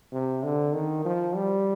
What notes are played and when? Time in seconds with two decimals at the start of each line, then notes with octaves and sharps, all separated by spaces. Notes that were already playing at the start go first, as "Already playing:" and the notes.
0.12 C3
0.43 D3
0.74 D#3
1.05 F3
1.35 G3